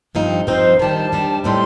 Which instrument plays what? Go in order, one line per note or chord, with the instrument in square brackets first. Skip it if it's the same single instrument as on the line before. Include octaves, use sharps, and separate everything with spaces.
[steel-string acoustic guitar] G2 F3 C4 D#4
[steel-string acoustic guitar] G2 F3 C4 D#4 [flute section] C5
[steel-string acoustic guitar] D#3 G3 D4 [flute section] A5
[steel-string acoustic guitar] D#3 G3 D4
[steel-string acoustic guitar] A2 G3 C4 D#4 [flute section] C6